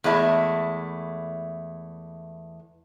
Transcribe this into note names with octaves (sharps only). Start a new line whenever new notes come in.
E2 G#3 A3 E4